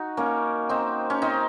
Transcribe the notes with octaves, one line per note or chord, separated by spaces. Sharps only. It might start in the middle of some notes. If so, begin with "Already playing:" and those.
Already playing: D#4 F#4
A#3 C#4
C4 D#4
C#4
C4 D#4